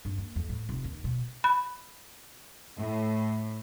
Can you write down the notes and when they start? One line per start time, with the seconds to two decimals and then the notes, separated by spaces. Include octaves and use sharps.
0.05 G2
0.18 A#3
0.36 F2
0.49 A2
0.69 F1
0.84 D#2
1.04 B2
1.44 B5
2.77 A2